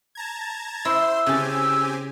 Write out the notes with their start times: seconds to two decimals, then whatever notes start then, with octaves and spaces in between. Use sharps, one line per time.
0.15 A5 A#5 G#6
0.85 E4 C5 C6 E6
1.26 C#3 C4 G4 A4 G#5